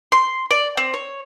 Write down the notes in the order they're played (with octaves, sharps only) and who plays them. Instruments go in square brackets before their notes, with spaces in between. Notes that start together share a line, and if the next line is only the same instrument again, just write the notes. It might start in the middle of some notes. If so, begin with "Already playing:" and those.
[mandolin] C6
D5
C4
C#5